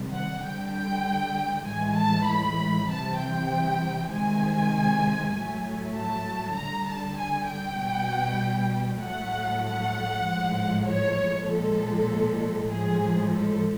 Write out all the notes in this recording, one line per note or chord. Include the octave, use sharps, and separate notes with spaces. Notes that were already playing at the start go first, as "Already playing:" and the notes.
Already playing: C3 D#3 G3
F#5
D3 G3 G5
G5
A2 E3 G#3 G#5
A5
B5
C3 E3 G3 A5
G5
C3 D#3 G#3 G#5
A2 F#3 A3
A5
D3 G3 A#5
A5
G#5
G5
B2 G3
A2 F#3 A3 F#5
F#5
A2 F3 G#3
C#5
A#2 F3 G#3 A4
A2 F3 G#3 G#4
A4